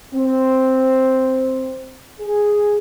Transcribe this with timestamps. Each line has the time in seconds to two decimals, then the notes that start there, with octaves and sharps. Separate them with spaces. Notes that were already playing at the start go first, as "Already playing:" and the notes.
0.13 C4
2.20 G#4